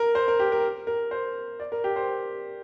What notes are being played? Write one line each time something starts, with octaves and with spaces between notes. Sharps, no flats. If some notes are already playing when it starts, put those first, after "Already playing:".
Already playing: A#4
C5
A#4
G4
A#4
A#4
C5
D5
A#4
G4
C5